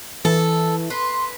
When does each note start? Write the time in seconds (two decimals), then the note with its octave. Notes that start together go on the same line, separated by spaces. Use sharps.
0.25 E3 A4
0.90 B4 C6